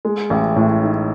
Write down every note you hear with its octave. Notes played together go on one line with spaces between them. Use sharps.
G#3
A1
A2
D#4